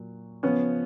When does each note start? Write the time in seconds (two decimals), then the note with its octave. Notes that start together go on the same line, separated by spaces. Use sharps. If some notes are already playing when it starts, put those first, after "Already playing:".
Already playing: A#2 F#3
0.43 C#3 F3 B3 C#4